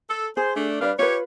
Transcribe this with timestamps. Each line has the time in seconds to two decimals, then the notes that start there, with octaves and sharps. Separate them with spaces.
0.10 A4
0.37 G#4 C5
0.56 A3 D4
0.81 G3 D4 B4 D5 F5
0.99 F4 G4 B4 C#5